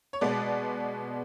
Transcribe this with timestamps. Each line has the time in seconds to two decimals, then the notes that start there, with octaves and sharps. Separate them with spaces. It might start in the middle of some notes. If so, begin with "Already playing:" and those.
0.13 C#5
0.21 B2 G#3 B3 D5